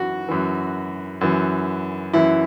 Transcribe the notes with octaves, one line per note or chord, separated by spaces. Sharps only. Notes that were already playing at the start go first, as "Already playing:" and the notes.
Already playing: F#2 E3 F#4
F#2 E3
F#2 E3
F#2 E3 E4